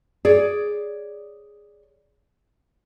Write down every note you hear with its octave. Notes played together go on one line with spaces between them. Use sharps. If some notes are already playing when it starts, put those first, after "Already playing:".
G#4 C#5 D5